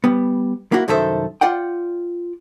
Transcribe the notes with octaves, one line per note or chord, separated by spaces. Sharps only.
G3 B3
A#3 E4 F#4
C2 F#2 D#3 A4 C5 E5
F4 D5 F#5 G5